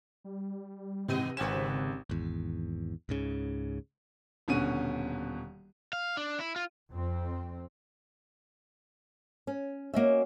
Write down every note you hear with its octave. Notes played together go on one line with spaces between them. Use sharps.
G3
G#2 C3 D#3 B3 D#5 D#7
G#1 C#3 C4 F#4 B4 E7
G#1 E2
C#2 G#2 C#3
D#1 B2 D3 C#4 F#4 D#7
F5
D4
E4
F4
F2 C4
C#4
A#3 C#4 F#4 D#5 E5